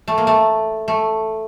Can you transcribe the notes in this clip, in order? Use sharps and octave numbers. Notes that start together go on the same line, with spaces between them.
A3
A#3
A3
A3